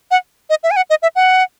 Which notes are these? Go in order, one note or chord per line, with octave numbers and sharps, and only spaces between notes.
F#5
D#5
E5
G#5
F#5
D#5
E5
F#5